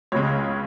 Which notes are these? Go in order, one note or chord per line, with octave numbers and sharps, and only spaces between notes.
C#2 C#3 G#3 C#5